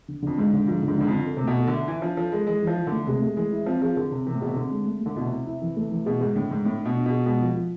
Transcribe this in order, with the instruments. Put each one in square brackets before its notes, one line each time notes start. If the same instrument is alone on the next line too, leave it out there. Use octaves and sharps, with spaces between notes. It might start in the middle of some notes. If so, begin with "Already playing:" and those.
[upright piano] D3
[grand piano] F2 [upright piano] D3
[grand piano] G#2 [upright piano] G#3
[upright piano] D3
[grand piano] G#2 [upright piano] F3
[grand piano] G#2 [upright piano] D3
[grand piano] G#2 [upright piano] D3
[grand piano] F2
[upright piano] D3
A4
[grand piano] C3
[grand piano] B2 [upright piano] A3
[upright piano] A4
[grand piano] D3 [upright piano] E5
[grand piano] E3 [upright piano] E5
[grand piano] F3 [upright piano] D4
[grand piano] F3 [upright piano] A4
[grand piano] G#3 [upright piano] A4
[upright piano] E3 [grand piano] G#3
[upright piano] E3 [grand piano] F3
[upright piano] E3
[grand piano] D3
[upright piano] A3
[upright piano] C3 [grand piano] G#3
[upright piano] A3
[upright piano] E3 [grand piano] G#3
[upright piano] E4
[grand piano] F3 [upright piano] C4
[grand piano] F3 [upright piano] G#4
[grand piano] D3 [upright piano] G#4
[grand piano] C3 [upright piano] C4
[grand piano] C3 [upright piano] E3
[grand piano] A2
[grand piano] B2 [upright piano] G#4
[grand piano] C3
[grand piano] D3 [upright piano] C4
[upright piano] G#3
A3
[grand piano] D3 [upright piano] A3
[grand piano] B2 [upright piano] E4
[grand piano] C3 [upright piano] E4
[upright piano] E4
E3
A3
E3
[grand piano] B2 [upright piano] G#4
[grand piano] G#2 [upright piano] G#4
[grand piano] A2 [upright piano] D3
[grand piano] G#2 [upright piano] D3
[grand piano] A2 [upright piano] D4
[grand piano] B2 [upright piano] D4
[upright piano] D4
[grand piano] B2 [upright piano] G#4
[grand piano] B2 [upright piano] G#3
[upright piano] F3
F3